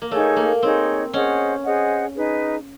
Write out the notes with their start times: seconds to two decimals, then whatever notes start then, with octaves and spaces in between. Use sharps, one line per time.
0.02 A#3
0.11 A3 D#4 G#4 C#5
0.36 A#3
0.62 C4 D#4 G#4 C#5
1.13 C#4 G#4 C5 D#5 F#5
1.64 G#4 C5 D#5 F#5
2.15 D#4 G#4 B4